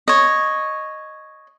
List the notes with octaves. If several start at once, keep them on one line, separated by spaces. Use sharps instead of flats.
C#5 D#5